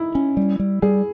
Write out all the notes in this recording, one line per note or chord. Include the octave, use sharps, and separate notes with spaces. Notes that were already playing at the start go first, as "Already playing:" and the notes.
Already playing: D#4 E4
C#4
G3
G3
G3 G#4